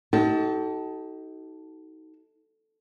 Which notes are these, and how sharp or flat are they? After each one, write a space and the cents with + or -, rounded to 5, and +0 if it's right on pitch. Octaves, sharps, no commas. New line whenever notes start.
D#4 +25 F#4 +45 A4 +0